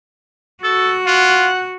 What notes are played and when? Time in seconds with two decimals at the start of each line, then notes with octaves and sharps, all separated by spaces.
0.63 F#4 A4
1.06 F4 F#5